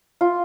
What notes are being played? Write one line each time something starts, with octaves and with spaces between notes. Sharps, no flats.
F4